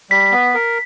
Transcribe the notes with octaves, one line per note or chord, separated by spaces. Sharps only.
G3 B6
B3
A#4